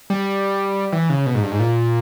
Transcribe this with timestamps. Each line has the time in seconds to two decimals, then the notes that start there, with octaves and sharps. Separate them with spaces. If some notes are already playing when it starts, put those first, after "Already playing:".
0.10 G3
0.92 E3
1.10 C#3
1.26 B2
1.35 G#2
1.43 G2
1.52 G#2
1.60 A#2